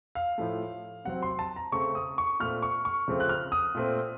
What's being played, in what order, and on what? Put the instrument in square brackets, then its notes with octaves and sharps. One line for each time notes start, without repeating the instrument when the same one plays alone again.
[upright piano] F5
A2 F3 A3
C3 F#3 C4 F#5
C6
A5
A#5
C#3 A3 C4 C#6
D#6
C#6
A#2 A3 C4 F6
C#6
C#6
C#3 F3 A3 C4
F#6
F6
D#6
A#2 A3 C4